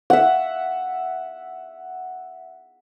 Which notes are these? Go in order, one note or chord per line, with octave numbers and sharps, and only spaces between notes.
E5 F#5